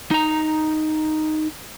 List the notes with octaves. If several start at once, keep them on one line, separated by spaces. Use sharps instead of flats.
D#4 A#5